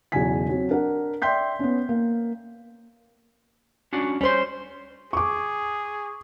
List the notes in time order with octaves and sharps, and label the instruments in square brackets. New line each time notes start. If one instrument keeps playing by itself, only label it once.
[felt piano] B1 E2 C#3 F#3 G#5 B6
F#3 C4
D4 A#4 F#5
D5 E5 G5 C6 G6 B6
B3 C#4
A#3
[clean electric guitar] C#4 D4 F#4
[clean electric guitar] G3 C6 [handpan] C#4 C5
[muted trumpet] G#4 [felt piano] C#6 D6